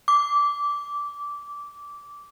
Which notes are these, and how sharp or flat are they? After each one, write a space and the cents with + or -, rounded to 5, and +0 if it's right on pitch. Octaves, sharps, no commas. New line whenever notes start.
D6 -15